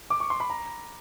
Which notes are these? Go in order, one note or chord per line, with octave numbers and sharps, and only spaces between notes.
D6
C#6
C6
B5
A#5